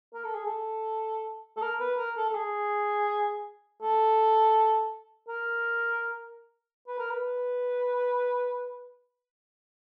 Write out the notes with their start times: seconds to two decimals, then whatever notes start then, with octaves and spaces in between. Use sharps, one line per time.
0.14 A#4
0.24 A4
0.35 G#4
0.46 A4
1.57 A4
1.62 A#4
1.80 B4
1.98 A#4
2.16 A4
2.29 A4
2.35 G#4
3.82 A4
5.28 A#4
6.88 B4
6.99 A#4
7.10 B4